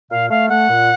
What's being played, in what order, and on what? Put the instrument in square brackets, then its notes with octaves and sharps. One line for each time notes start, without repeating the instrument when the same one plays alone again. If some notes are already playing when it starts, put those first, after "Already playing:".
[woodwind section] A#2 F5
A3 F5
A3 F#5
A#2